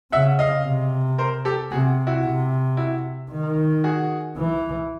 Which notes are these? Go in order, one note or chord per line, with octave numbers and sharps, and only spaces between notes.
C#3 E5 F#5
D#5 F5
C3
A#4 C5
G4 A4
C3 F#4 G#4
E4 F#4
C3
E4 F#4
D#3
F#4 G#4
E3